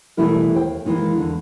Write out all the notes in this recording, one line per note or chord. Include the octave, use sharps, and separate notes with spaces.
B2 E3 G3 A3 E4 A#4
D#2 C5 G5
A#2 D#3 E3 G#3
E2 D3